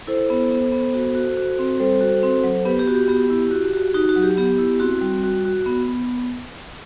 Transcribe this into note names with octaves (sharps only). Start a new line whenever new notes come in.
E4 A4 C5
B3
B3
B3
F#4
F#4
F#4
C4
G3 A4 C5
F#4
C4
F#3
B3 G4 B4
G4
F#4
G4
B3 G4
E4
F#4
F#4
D#4 F#4
F#4
F#3
G4
B3 G4
E4
C4 F#4
G3
F#4
F#4
B3
B3